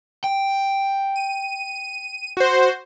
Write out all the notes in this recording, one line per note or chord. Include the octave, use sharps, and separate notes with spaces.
G5
D#7
F#4 C5